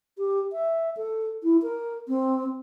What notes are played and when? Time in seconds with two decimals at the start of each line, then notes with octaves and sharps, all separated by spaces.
0.18 G4
0.53 E5
0.97 A4
1.44 E4
1.62 A#4
2.08 C4